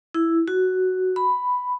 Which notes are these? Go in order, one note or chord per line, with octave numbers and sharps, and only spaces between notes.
E4
F#4
B5